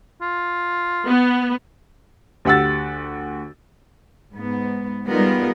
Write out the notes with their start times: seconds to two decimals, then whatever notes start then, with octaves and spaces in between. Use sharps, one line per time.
0.21 F4
1.06 B3
2.45 D2 G4 F#5 E6 A6
4.33 G#2 B3
5.07 G3 G#3 B3 D#4 F4 A#4